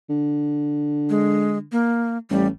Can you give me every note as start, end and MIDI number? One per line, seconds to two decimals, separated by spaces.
0.10 1.67 50
1.10 1.58 56
1.72 2.18 58
2.30 2.49 33
2.30 2.47 55